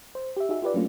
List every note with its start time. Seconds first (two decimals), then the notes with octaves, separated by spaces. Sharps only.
0.15 C5
0.37 G4 E5
0.49 D#4 F#4 G#4 E5
0.62 F4 G4 B4 D5
0.74 F#3 A3 A#3 C#4 D4 F4